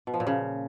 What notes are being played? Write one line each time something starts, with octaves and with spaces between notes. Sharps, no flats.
B2
F3
A#2
C#3